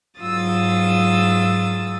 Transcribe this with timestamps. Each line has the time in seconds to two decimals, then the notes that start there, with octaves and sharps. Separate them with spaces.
0.20 G#2 F#3 F4 D#6 E6 A6